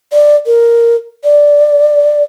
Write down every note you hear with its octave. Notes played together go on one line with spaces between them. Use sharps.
D5
A#4
D5